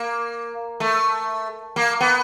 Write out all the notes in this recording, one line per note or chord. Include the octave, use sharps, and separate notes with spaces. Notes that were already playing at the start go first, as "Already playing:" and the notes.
Already playing: A#3
A3
A#3
B3